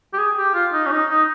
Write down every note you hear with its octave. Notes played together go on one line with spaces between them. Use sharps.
G4
G#4
G4
F4
D#4
C#4
D#4
D#4